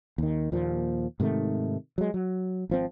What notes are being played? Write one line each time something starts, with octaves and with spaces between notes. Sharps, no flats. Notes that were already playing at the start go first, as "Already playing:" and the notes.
D#2 D#3
D#2 A#2 F3
G#2 C3 D#3 A3
F#3 G#3
F#3
G#1 F3 C4